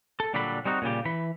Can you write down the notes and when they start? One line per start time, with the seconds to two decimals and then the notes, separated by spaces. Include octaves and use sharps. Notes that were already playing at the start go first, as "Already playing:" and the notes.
0.20 A4
0.34 A#2 D3 F#3 G3 D4 B5
0.65 G3 C4 D#4 F#4
0.82 A#2 C#3 G3 G4
1.05 E3 B5